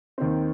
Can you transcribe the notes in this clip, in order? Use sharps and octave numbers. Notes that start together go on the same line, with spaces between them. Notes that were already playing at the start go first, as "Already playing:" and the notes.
D#2 D#3 C4